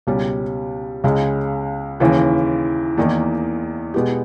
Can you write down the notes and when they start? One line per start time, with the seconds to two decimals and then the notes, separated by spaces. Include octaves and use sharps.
0.07 C#2 B2 G3 C#4
1.04 C#2 C#3 G#3
2.00 D#2 C#3 E3
2.97 E2 D#3 A#3
3.94 B2 G#3 B3 G4